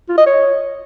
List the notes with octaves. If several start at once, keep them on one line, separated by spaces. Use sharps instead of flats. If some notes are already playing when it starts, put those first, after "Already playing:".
F4
D#5
C#5